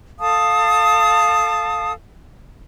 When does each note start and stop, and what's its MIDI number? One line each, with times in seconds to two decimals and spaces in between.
0.19 1.93 69
0.19 1.93 77
0.19 1.93 81
0.19 1.93 87